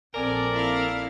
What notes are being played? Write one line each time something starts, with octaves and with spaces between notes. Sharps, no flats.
A#1 A#2 C4 A4 A#4 D5 G#5
E4 F5